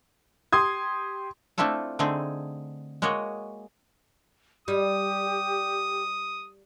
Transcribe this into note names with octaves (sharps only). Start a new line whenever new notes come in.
G4 C6 D#6 G#6
A3 C4 D4 E4 F4 A4
D3 A3 C4 D#4 G#4
G#3 A#3 F#4 C#5 D#5
G3 G4 D#6